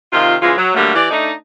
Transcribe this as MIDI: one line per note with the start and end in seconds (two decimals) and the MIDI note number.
0.13 0.35 48
0.13 0.35 51
0.13 0.35 65
0.42 0.53 49
0.42 0.53 52
0.42 0.53 56
0.42 0.53 65
0.57 0.72 54
0.75 0.93 50
0.75 0.93 54
0.75 0.93 55
0.75 0.93 57
0.75 0.93 58
0.95 1.07 52
0.95 1.07 67
0.95 1.07 74
1.10 1.32 57
1.10 1.32 62
1.10 1.32 63